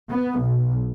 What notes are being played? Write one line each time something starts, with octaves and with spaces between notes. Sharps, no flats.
B3
B1